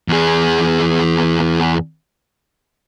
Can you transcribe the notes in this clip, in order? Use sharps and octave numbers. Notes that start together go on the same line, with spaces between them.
E2 G#4